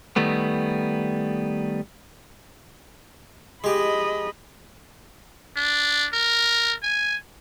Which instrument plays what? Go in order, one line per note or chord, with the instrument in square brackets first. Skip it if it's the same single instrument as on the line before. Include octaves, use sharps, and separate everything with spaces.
[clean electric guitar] D#3 G3 A3 B3
[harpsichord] G#3 G4 [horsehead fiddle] D#5 B5
[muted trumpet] D4
A#4
G#5